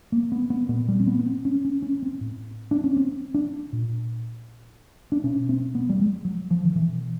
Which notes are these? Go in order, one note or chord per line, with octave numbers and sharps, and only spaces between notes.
A#3
B3
B3
A#2 B3
G3
C4
B3
B3
C4
C#4
C#4
C#4
C4
A2
D4
C#4
C4
D4
A#2
D4
B2 C#4
C4
B3
G3
G#3
F#3
F3
D#3
B2 E3